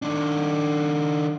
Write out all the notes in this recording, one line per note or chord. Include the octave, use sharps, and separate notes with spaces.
D#3 D4